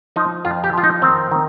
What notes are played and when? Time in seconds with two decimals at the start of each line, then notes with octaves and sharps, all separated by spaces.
0.16 F3 D#4
0.45 F2 F4
0.64 G4
0.73 F3 F4
0.84 D#4
1.02 D#3 C4
1.31 D#3